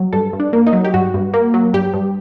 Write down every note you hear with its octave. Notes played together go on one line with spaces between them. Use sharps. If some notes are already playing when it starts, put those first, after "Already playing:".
Already playing: F#3
G2 A4
G2
D4
A#3
D#4
F#3
G4
G2 F#4
G2
A#3
F#3
G2 G4
G2